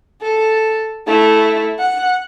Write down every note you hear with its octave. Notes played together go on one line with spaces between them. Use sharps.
A4
A3 E4
F#5